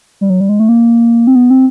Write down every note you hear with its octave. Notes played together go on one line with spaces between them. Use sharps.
G3
F#3
G3
G#3
A3
A#3
C4
B3
C4